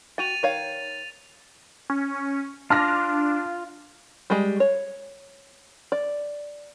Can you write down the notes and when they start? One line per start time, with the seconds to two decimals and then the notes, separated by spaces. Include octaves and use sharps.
0.18 F#4 G5 A6 D#7 F7
0.43 D#3 C#5 F5
1.90 C#4
2.70 D4 F4 A5 F6 A#6
4.30 G3 G#3
4.60 C#5
5.92 D5